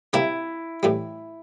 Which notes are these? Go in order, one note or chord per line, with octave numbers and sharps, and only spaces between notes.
C3 G3 A#3 E4
A2 E3 G3